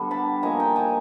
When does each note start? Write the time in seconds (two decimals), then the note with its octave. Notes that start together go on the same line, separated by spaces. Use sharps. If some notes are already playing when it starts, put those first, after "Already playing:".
Already playing: D3 G3 B3
0.11 A5 B5
0.43 F3 A#3 D#4 G#5 A#5
0.60 G5 A5
0.76 G#5 A#5